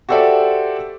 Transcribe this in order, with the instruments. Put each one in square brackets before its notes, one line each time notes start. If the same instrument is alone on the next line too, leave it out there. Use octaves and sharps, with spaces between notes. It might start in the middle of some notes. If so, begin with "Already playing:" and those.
[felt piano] F#4 G4 A4 C5 D5 E5